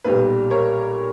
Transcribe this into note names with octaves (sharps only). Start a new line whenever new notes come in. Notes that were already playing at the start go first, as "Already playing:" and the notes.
B1 A#2 G3 B4
A#4 C#5